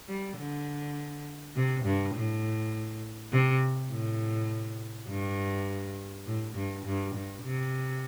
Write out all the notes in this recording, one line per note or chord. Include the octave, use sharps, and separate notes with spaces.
G3
D3
C3
G2
A2
C3
A2
G2
A2
G2
G2
G2
C3